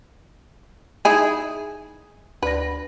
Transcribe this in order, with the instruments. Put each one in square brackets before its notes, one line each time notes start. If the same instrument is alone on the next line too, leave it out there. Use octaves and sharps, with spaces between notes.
[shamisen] D#4 E4 G#4 [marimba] D#6 G#6
[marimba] D2 D5 A#6 [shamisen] B4